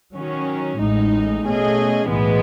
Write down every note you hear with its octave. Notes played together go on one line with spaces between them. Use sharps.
D#3 F#3 C#4
A1 A2 G#3 D#4
B2 A3 C#4 G#4 D#5
B1 A2 E3 G#3 B3